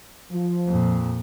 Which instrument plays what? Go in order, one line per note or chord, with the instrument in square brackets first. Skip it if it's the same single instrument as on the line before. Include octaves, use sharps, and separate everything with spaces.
[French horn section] F3
[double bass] F2 A#2